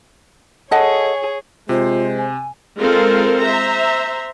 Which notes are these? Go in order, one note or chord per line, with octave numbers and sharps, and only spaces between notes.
G#4 A4 C#5 D#5 F#5
C3 G#3 F4 C5
G#5
G#3 C4 F4 A4 A#4 C5
C5 E5 A#5